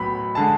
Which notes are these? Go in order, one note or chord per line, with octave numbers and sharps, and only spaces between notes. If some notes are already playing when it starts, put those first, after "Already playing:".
Already playing: B1 A2 F#3 B3 B5
D3 G#3 A5